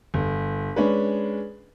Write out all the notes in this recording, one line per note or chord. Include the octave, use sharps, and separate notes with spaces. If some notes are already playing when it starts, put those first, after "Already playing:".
G1
G#3 C#4 D4 B4